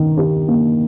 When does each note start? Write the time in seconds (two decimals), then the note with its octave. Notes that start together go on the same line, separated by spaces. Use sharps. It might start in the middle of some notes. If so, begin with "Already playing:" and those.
Already playing: D#3 D#4
0.17 G4
0.48 A#3